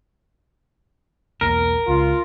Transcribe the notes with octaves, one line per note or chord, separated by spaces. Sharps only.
B1 E2 A#3 A#4
C#2 F4